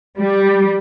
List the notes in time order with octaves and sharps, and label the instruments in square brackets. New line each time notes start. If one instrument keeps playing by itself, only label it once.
[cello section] G3